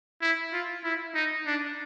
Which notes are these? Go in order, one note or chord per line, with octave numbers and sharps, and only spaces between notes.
E4
F4
E4
D#4
D4